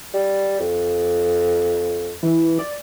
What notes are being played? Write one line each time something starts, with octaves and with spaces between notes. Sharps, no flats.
G3
F2
E3
D5